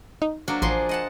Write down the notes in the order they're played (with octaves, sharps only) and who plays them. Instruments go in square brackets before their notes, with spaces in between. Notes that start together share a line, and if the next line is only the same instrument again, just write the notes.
[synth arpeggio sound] D#4
[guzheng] F#3 A#3 D4
[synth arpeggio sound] A1 [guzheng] F3 G#4 C6
[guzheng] D#5 F#5 A5